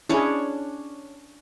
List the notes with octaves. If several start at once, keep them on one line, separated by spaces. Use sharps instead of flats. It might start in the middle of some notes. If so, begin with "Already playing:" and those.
C#4 D4 E4 G#4 C#5